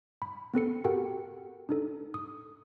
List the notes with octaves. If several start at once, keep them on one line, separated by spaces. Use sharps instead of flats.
B5
B3 C4 A4 C#7
F#4 G4 A4 A#4 F#5 G5
D4 D#4 A4
D#6